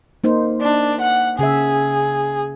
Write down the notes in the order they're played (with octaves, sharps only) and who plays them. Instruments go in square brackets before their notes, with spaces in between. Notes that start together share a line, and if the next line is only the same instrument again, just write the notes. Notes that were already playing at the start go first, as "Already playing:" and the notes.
[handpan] A#3 D#4 C5
[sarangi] D4
F#5
[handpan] C#3 E5 [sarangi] G#4